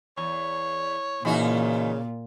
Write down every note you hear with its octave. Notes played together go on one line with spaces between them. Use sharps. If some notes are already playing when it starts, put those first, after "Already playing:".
E2 C#5
A#2 C#3 E3 D#4 F#4